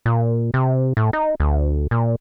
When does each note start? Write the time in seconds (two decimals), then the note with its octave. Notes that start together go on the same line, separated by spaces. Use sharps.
0.06 A#2
0.54 C3
0.97 A2
1.13 D#4
1.40 D2
1.91 A#2